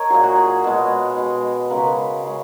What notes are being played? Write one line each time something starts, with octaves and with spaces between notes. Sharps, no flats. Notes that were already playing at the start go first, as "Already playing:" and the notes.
Already playing: A#4 C#5 D#5
A#2 F#3 G#4
F#4
G#4
B2 G#3
B2 G#3
C#3 G#3 A#4
B4
A#4
C#3 G#3